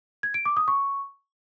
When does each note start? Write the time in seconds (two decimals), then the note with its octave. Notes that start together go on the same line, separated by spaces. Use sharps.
0.23 G#6
0.34 D7
0.45 D6
0.57 D#6
0.68 C#6